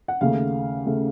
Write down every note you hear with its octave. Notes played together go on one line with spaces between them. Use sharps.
F#5
D#2 C#3 A3 F5
C#3 A3